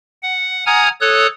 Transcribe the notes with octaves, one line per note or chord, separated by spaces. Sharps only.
F#5
F#5 G#5 A#5 D#6 F6 G#6
A4 C#5 D#6 F#6